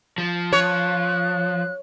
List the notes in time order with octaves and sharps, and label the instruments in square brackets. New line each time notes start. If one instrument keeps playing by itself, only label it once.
[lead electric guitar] F3
[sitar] C#5 [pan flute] F#6